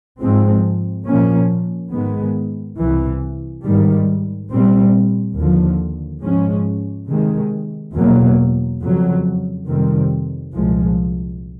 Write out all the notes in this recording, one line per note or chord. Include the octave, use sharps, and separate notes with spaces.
G#2 F3 G#3 C4
A#2 F3 A#3 C#4
G#2 D#3 G#3 B3
C2 C3 E3
G#2 D#3 G3
A#2 G3 C4
D#2 D3 F3
G#2 F3 G#3 C#4
C3 D#3 G#3
E2 B2 F#3 A#3
F2 C#3 F#3
F2 C3 D#3 G3 C4
C2 A#2 F3 G#3